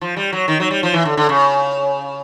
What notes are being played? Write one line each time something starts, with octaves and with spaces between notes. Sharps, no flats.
F3
G3
F#3
D#3
F#3
G3
F3
E3
D3
D3
C#3